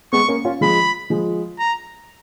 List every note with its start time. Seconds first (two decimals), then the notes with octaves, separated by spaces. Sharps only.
0.13 G#3 B3 C#6
0.28 A#3 C#4
0.45 C#4 F4
0.61 F3 G#3 B5
1.10 F3 G#3
1.59 A#5